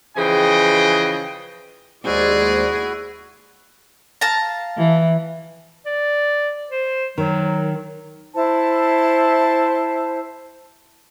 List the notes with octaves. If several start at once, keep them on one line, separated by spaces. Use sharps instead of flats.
C#3 E3 F3 G#4 D#5 G5
D#2 G#3 E4 F#4 G#4 C5 D5
F5 A5 A#5
E3
D5
C5
D#3 F#3
E4 C5 A5